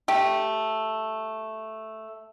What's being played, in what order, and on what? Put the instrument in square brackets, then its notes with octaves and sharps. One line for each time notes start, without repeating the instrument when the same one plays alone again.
[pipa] A3 G4